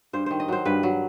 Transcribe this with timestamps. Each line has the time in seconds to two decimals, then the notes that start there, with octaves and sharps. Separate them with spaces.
0.13 G2 C5
0.26 D#3 C5
0.40 D#5
0.48 F#3 C5
0.65 G2 B4
0.83 F#3